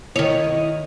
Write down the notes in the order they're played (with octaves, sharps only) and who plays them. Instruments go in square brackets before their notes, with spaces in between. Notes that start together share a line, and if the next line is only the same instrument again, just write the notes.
[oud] D#3 C#5 [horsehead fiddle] E4 D#5